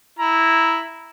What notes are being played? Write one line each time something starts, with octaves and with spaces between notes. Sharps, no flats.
E4 A#5